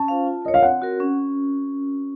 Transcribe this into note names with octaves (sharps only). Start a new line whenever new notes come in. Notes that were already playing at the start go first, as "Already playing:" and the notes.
Already playing: C#4 A5
F4 C5 F5
F4
A#4 C#5 D#5
F5
C4 F#5
F#4 A#4
C#4